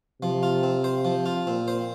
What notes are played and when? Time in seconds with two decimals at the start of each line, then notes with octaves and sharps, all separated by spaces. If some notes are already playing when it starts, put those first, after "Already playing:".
0.22 C3 F3
0.43 F4
0.63 C4
0.84 C5
1.05 F3
1.26 F4
1.47 A#2 C4
1.68 C5